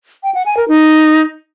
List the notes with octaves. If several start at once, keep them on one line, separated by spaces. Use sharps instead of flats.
G5
F#5
G#5
A#4
D#4